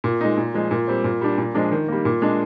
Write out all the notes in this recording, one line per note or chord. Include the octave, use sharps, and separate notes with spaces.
A#2
G#3 D#4
A#2
F3 G#3
A#2
G3 C4
A#2
G3 D4
A#2
F3 G#3 D4
D#3
G3 A#3
A#2
G#3 D4